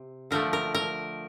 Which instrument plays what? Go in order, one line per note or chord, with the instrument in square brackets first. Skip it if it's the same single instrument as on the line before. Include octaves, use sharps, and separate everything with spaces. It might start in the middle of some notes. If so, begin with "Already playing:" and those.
Already playing: [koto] C3
D3 F3 A3 A#4
A#4
A#4